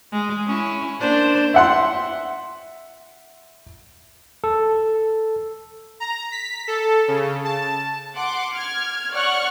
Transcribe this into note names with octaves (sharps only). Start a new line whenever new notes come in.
G#3
C#4 E4
A#3 D4 C5
E5 F#5 C6
A4
A#5
B6
A4
C#3
A5
F#5 C6 D6
F6 G#6
C#5 D5 F#5 C#6 F6 F#6